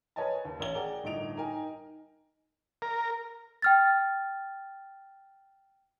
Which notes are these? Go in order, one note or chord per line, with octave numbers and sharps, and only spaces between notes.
A#4 B4 C#5 D#5 G#5 A5
D#2
A1 A#4 C#5 G7
G#4 A#4 D5 F#5 G5
G1 A2 D#4 D#5 D7 F7
D#4 A#4 G5 G#5
A#4
G5 F6 A6